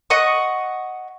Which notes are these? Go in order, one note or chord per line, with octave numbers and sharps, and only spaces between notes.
D#5 F#5 C#6 D#6